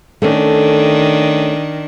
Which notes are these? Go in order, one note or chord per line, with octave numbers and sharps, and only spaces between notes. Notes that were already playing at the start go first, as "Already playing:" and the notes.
D#3 A3 C#4 D4